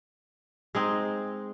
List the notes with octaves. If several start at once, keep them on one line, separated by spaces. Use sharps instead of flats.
G#3 C4 D#4